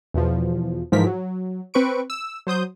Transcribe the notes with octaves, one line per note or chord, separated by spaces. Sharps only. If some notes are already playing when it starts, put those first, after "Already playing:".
E2 B2 F3
G#2 E3 F3 A#4 B6
F#3
C4 B4 C#6 D7
E6
F#3 C5 D#6 G6